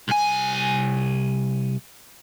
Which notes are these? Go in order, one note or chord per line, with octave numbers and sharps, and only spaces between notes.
C2 G#5